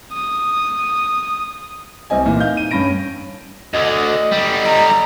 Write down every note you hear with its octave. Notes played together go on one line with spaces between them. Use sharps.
D#6
C2 C4 D#5 G#5
A#2 E3
D#4 F5 G6
D#7
G2 C#4 B5 A#6 D7
D2 D3 D#5
D3 G3
A#5